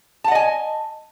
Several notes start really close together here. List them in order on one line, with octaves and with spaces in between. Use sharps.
A5 F#5 D#5 G#5